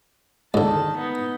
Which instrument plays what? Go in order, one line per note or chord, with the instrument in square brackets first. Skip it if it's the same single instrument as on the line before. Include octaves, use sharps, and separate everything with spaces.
[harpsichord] G#2 D3 [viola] D#3 A5
[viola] B3 D#4